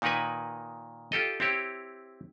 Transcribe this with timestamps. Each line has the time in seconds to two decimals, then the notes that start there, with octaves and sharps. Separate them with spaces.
0.02 A#2 D#3 D#4 A#4 B4 G#5
1.12 F4 G4 A4 D#5
1.40 C4 E4 G4 C#5